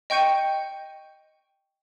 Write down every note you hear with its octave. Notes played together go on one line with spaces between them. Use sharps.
D#5 G5 C#6 G6 C#7 D#7